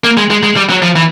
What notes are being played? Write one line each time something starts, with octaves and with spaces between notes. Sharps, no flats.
A#3
G#3
G#3
G#3
G3
F#3
F3
E3